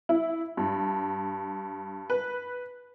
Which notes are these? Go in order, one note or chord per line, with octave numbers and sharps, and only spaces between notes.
E4
G2
B4